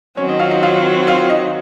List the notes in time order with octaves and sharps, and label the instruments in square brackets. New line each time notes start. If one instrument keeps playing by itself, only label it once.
[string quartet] D#3 F#3 C4 [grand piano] C#4 C#5
[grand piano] D#4 D#5
F4 F5
D#4 D#5
F4 F5
F4 F5
D#4 D#5